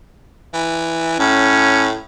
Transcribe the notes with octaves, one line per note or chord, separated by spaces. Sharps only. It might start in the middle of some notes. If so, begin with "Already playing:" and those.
E3
A2 C#4